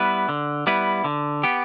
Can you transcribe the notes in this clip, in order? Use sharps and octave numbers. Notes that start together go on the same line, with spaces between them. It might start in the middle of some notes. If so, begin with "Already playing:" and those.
Already playing: G3 B3 E4 B4
D3
G3 B3 E4 B4
D3
B3 G4